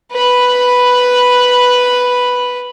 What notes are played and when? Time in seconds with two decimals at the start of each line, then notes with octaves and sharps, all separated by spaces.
0.12 B4 B5